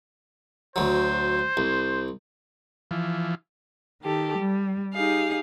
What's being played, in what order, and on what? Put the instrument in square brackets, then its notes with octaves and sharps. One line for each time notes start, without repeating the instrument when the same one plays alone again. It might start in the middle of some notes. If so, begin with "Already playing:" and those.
[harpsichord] D2 F#3 [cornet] C5
[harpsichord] C2
[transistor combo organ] E3 F3
[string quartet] D#3 G4 A4
G3
D#4 G4 G#4 F5